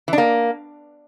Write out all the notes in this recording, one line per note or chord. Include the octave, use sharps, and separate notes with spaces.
E3
D4
A#3